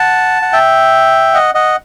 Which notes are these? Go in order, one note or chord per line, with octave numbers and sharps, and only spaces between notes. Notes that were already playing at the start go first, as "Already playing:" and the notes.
Already playing: F#5 A5
F#5
E5 G5
D#5 F#5
D#5 F#5